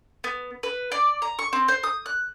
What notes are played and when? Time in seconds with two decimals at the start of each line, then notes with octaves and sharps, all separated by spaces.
0.24 B3
0.63 B4
0.92 D5
1.22 A#5
1.39 C#6
1.53 C4
1.68 C5
1.83 D#6
2.06 F#6